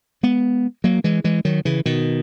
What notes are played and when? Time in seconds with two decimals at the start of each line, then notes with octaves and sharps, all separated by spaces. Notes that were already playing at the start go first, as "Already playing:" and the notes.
0.23 G#3 B3
0.84 F#3 A#3
1.04 E3 G#3
1.24 E3 G#3
1.45 D#3 F#3
1.65 C#3 E3
1.86 B2 D#3